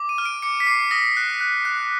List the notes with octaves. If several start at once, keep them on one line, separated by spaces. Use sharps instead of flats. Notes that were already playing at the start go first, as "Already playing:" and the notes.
Already playing: D6
D#7
F6
D7
D6 C#7
B6
D6 C7
D#6 A#6
F#6
F#6
F#6